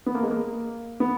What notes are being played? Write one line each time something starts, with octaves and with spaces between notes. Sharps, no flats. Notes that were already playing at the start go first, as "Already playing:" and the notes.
B3
A#3
G#3
A#3
B3